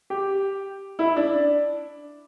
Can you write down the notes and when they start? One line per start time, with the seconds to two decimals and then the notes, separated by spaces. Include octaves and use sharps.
0.10 G4
0.99 E4
1.16 D4